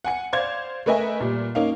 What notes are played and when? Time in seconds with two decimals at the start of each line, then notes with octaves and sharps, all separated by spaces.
0.04 F#5 G#5 C#7
0.33 C5 D5 F5 G#6
0.86 A3 A#4 B4 D#5 E5 G#5
1.20 A#2 G3
1.55 A#3 C#4 D#4 F5